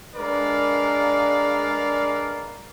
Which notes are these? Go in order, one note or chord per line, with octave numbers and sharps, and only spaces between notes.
G#3 D4 A#4 B4 D5 F5